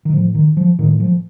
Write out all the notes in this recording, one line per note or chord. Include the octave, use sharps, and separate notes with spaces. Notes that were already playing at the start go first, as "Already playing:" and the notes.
D#3
A2 F3
D#3
F3
A2 D#3
F3